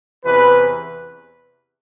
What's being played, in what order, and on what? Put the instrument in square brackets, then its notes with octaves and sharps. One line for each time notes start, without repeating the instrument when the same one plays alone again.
[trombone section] E2 C3 E3 B4